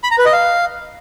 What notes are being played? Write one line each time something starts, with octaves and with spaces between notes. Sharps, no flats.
B5
A#5
B4
D#5
F5